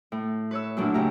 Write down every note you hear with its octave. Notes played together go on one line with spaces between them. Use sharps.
A2
B4 C#5 E6
F#2 A#2 A3 D4 E4 F#4
C#3 D#4 G4 E5 A#5